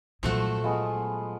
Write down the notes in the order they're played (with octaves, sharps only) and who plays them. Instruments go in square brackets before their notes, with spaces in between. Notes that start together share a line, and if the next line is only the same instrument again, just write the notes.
[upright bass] A#2 F#3 [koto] F3 A3 F#4
[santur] G#3 B3 F4